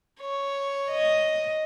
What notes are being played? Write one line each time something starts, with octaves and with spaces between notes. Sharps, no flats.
C#5
D#5